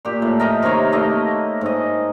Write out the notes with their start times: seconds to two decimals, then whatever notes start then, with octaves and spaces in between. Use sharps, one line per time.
0.05 A#2 G4
0.22 A2
0.40 A#4 D#5 G5
0.62 C3 D#3 A#4 C#5
0.92 A3 A#3 D#5
1.61 G#2 D#5